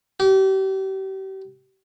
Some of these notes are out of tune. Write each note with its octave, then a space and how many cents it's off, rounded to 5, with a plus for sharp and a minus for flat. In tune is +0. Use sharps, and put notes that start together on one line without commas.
G4 -35